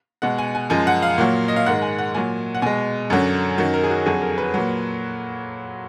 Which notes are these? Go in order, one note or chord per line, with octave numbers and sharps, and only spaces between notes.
B2 G#3 F#5
G#5
G#5
F#2 F3 G#3 G#5
F#5
F5
A#2 F#3
D#5
F5
G#2 D#3 G#3 F#5
G#5
F#5
A#2 F#3 G#5
F#5
B2 G#3 G#5
F#2 D3 F#3
F#2 D#3 F#3
A#4
G#4
F#4
F2 D3 F#3 G#4
A#4
B4
A#2 F#3